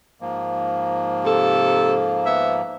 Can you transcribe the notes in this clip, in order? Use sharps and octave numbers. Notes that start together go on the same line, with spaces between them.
G#2 F3 A#3
C3 A4
B3 E5